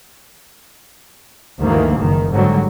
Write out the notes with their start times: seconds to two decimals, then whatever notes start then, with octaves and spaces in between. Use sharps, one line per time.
1.60 D2 G2 D#3 E3 A#3
1.98 F#1 D#3
2.31 G#2 D3 F#3 G3